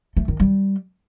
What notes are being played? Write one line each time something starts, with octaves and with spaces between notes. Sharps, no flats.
A3
D#3
G3